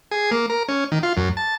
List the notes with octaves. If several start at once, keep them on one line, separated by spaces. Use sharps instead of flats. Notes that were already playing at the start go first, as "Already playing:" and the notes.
G#4
A#3
A#4
C#4
D#3
F4
F#2
A5